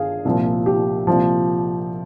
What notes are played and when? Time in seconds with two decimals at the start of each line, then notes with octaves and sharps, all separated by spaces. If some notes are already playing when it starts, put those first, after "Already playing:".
Already playing: G1 G2 D#3 G#4 F5
0.25 C2 A#2 F3
0.66 G4
1.07 C2 A#2 F3